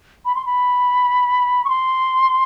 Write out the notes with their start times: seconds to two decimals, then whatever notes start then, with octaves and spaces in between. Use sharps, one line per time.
0.25 B5
0.35 C6
0.46 B5
1.65 C#6
1.69 C6